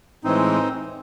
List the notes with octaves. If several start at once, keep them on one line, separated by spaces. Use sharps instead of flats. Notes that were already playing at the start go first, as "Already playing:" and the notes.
A2 E3 G#3 C4 D#4